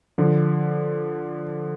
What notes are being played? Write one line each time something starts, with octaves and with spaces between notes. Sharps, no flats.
D3 F3